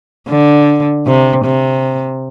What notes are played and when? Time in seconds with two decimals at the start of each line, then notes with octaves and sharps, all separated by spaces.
0.28 D3
1.06 C3
1.45 C3